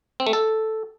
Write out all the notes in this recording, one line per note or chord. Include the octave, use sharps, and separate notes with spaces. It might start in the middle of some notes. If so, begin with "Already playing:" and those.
C4
A3
A4